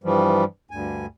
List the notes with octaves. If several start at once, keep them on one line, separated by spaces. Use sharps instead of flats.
G2 E3 F3 G3
D2 G2 G#5